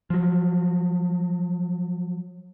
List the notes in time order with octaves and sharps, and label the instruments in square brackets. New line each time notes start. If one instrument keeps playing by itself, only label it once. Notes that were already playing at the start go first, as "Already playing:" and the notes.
[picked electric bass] F3 F#3